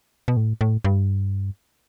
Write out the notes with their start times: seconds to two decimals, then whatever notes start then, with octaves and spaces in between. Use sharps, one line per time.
0.28 B2
0.37 A2
0.61 A2
0.85 G2